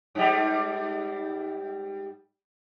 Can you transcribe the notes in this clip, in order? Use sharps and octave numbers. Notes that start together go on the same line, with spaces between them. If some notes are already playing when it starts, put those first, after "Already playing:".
G#2 G3